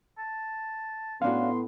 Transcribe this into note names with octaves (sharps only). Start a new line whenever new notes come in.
A5
A2 B3 C#4 D4 F#4 F5 C6